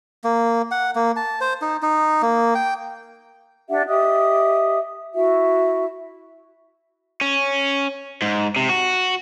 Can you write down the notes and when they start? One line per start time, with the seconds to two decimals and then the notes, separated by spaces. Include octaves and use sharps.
0.24 A#3
0.71 F#5
0.95 A#3
1.16 A5
1.41 C5
1.62 D#4
1.82 D#4
2.22 A#3
2.55 G5
3.68 D4 G4 E5 F#5
3.87 G4 D#5 E5 D#6
5.14 E4 F#4 E5
7.21 C#4
8.22 G#2
8.56 C3
8.69 F#4